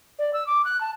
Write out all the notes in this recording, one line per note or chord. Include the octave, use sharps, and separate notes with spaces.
D5
E6
D6
F#6
A5